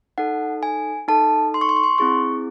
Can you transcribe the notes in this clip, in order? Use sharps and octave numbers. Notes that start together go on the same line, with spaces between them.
D#4 A4 F#5
G#5
D#4 A4 A5
C6
C#6
C6
C#6
C6
C4 E4 G#4 C#6